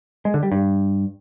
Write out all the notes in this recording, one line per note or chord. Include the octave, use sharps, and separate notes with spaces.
G#3
D3
G3
G2